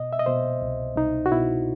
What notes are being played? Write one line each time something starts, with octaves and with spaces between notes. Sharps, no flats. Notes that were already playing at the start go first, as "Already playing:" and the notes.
Already playing: B2 D#5
E5
D#5
B2 C5
C2
C2 D#4
F#4
B2 E4